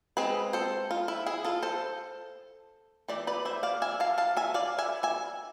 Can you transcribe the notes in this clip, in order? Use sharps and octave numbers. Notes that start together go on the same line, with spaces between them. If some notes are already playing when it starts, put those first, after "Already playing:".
G#3 C4 G#4 B4
A4 C5
F4
E4
E4 G#4
F4 A4
A4 C5
E3 A3 D5
B4 D5
C5 E5
D5 F5
E5 G#5
F5 A5
F5 A5
E5 G#5
D5 F5
E5 G#5
E5 G#5